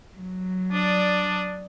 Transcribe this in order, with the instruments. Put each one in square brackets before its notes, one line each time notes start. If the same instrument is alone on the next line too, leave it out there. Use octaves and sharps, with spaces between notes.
[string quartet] F#3
[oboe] D4 [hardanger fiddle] D5 D#6